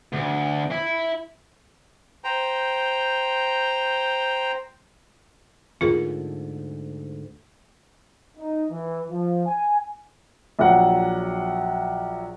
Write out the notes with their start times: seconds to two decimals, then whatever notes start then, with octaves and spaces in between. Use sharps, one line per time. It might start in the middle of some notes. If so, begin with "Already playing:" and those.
0.13 D2
0.71 E4
2.24 C5 G5 A#5
5.81 D2 G#2 F4 G#4 A#4
8.38 D#4
8.71 E3
9.10 F3
9.45 G#5
10.59 A#1 F#3 F#5